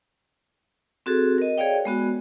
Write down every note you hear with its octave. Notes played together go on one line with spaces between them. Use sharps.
C4 F#4 G#4 A4
A#4 D#5
G#4 C#5 D5 F5 G5
G#3 B3 F#4